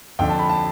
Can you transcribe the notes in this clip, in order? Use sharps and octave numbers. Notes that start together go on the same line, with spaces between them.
F2 D3 G5
A5
B5
A5